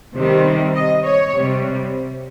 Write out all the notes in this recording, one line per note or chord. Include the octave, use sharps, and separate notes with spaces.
C3 D#3 G3
D#5
C#5
C3 G3